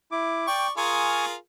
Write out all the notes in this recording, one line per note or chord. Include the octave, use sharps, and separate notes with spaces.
E4 D6
D5 G5 C#6
F4 G#4 A#4 G#5 C#6 D#6